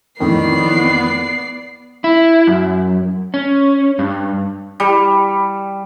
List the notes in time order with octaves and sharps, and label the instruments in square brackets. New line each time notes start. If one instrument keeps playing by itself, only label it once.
[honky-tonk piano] F2 A2 E3 [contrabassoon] D#3 [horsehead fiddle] B3 [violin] D5 C7
[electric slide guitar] E4
F#2
C#4
G2
[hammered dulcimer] G3